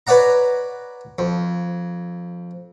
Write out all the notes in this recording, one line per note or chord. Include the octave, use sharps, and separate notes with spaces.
B4 C#5 D5 F#5 A#5
F2